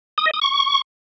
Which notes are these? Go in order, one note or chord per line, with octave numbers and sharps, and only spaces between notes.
D#6
D#5
D#6
C#6